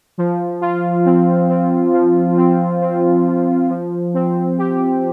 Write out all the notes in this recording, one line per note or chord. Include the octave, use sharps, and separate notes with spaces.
F3
F4
C4
C4
F3
C4
C4
F3
F3
C4
G4